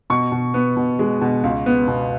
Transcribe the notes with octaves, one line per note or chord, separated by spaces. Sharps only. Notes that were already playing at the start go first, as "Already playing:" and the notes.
B2 C#6
B2
B3
B2
G#3
B2
C#2
B3
B2